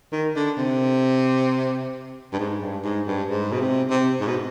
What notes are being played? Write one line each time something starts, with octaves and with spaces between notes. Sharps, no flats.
D#3
D3
C3
G2
G#2
G2
G#2
G2
G#2
B2
C3
C3
G#2
B2